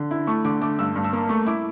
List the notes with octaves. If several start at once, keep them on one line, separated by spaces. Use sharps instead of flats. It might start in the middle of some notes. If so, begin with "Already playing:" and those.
Already playing: D3
E4
A3 C#6
D3 D6
A3 D6
G2 E6
G2
E6
A#3
A3 C#6
E4 D6